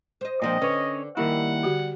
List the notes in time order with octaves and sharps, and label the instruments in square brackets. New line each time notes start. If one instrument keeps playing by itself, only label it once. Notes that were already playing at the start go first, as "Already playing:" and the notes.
[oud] C5 D#5
[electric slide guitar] A#2 D#3 F3 [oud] G#3 C4 D4 [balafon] D5 [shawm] D#5
[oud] D3 [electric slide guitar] C#4 C#5 [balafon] B4
[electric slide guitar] D#3 A#3 E4 [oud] G3 [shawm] F#5
[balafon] D3 F#4 G4